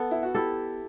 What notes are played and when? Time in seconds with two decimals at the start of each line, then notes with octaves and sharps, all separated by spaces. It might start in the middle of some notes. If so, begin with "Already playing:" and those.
Already playing: B3 A4
0.11 E4
0.23 F#4
0.34 E4 G4 A4